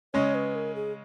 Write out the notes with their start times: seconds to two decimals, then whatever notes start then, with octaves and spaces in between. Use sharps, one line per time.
0.14 C#3 G#3 C#4 C#5
0.35 B4
0.55 A#4
0.76 G#4